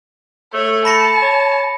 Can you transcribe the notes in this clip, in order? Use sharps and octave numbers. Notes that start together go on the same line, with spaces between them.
A3 C#5
A5 B5 A#6 C#7
C#5